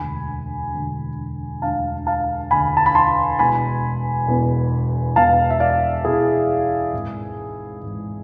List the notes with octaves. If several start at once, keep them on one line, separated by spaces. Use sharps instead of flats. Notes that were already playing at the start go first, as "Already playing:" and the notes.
Already playing: E1 D2 D3 G#5 B5
E1 D2 D3
E1 D2 D3 F5 A5
F5 A5
E1 D2 D3 G#5 B5
A5
B5
A5 C6
E1 E2 B2 G#5 B5
E1 E2 B2
E1 E2 B2 F5 A5
E5
D5 F5
E1 E2 B2 E4 G#4
G#1 G#2 E3
G#1 G#2 E3